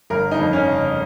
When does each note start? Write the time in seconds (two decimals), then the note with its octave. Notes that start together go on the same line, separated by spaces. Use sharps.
0.10 G1 A#4
0.31 D#4
0.39 F2
0.53 C#4
0.67 C#3